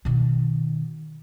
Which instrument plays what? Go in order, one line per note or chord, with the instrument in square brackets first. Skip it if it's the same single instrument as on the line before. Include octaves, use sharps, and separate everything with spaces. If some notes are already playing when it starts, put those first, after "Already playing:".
[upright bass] B2 D#3